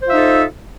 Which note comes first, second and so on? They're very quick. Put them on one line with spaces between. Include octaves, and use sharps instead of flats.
C5 F4 E5 D#4 A4